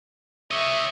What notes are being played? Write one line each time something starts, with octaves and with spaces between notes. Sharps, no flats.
C#5 D#5 E5